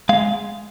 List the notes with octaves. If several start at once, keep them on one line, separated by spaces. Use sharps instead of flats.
G#3 F5